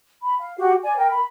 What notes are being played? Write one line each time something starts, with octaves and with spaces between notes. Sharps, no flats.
B5
F5
F#4 G4
D5 G#5
A#4 G5
B5